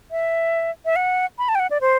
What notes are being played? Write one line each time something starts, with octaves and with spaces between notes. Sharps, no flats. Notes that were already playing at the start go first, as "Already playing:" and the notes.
E5
E5
F#5
B5
A5
G5
F#5
D5
C5